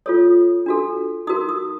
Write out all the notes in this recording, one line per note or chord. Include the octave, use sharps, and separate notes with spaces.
F4 A4 C#5 D#6
D4 F#4 A4
D#4 F#4 A#4 D#6
D#6